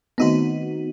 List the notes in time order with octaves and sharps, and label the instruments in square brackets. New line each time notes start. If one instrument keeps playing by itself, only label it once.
[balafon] D#3 A3 C4 [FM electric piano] B3 D#4 F#4